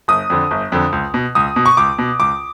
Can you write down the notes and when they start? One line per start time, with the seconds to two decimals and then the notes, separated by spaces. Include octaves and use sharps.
0.08 G1 D#6
0.30 F2 D3
0.51 G1
0.72 F2 D3
0.92 C#2
1.14 B2
1.35 C#2 D#6
1.56 B2
1.66 C#6
1.77 C#2 D6
1.99 B2
2.20 C#2 D6